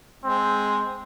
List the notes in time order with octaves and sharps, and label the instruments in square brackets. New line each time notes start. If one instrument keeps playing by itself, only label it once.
[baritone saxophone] G#3 [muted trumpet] C4